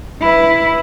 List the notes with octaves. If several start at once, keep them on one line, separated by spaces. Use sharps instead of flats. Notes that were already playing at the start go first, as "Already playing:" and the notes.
E4 B4